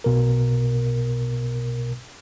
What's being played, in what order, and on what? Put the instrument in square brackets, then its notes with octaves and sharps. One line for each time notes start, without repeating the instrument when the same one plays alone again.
[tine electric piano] B1 B2 A#4